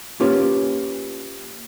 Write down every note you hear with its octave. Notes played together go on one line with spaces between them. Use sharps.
A#3 C#4 F4 G4 B4